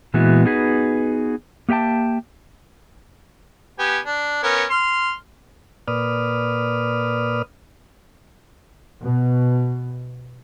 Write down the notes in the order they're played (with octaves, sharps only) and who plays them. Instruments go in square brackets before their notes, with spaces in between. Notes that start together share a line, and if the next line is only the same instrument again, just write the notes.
[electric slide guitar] A#2 E3 G#3 B3 E4 F#4
B3 D#4 F#4 G#4 B4
A#3 G4 E5 G5 A5
[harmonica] B3 G4 G#5
D4
B3 C#4 A#4
C6 F6
[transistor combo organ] A#2 B4 D5 D#6 F6
[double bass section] B2